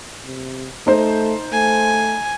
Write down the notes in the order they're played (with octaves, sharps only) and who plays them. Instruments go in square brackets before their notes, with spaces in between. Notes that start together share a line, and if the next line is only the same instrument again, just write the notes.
[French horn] C3
[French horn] A3 [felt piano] D#4 C5
[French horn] A3 [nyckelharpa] G#5